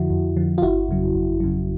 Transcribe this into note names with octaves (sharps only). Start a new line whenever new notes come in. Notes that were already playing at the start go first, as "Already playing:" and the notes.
Already playing: F2 D3 F3 E4 F#4
F2
D3 F3
F4
G1 E4 F#4
F2 C#3 F#3
G1
F2 C#3 F#3